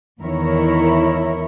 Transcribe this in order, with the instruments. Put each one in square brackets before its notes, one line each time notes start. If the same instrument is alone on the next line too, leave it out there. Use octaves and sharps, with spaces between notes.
[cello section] E2 D#3 E4 A#4 C#5